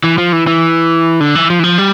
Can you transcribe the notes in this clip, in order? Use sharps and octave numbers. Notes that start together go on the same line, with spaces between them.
E3
F3
E3
E3
D3
E3
F3
E3
F3
G3